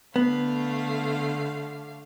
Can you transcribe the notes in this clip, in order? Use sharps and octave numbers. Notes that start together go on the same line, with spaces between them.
D3 A3 B3 F5